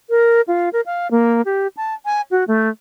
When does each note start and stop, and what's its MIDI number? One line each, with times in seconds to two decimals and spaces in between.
0.10 0.41 70
0.48 0.69 65
0.73 0.81 70
0.86 1.10 77
1.11 1.42 58
1.45 1.67 67
1.77 1.94 81
2.05 2.21 80
2.31 2.44 66
2.48 2.69 57